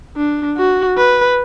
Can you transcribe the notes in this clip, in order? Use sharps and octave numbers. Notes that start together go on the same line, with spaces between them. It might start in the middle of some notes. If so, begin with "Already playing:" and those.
D4
F#4
B4